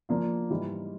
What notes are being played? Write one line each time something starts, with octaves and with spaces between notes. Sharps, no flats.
F3 A#3 D4 F4
G#2 E3 G3